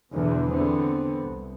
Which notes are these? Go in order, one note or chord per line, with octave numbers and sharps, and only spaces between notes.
E2 B2 D3 E3
D3 B3 C4
C2